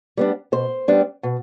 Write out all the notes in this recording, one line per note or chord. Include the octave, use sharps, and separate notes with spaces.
G3 B3 D4
B2 C5
G3 B3 D4
B2